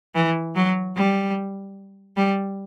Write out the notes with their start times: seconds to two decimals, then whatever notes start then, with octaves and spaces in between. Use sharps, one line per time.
0.15 E3
0.55 F#3
0.96 G3
2.17 G3